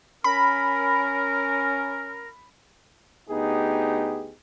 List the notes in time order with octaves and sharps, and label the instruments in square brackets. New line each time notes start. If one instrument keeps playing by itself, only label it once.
[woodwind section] C#4 A#4 [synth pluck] B5
[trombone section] D2 B3 D#4 G4 G#4